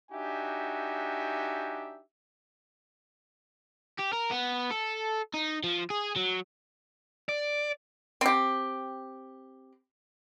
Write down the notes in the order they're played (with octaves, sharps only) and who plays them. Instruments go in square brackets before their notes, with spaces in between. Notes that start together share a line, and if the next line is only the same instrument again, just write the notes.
[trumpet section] D4 D#4 F#4 G4 E5 G#5
[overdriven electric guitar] G4
A#4
B3
A4
D#4
F3
G#4
F#3
D5
[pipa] C4 G4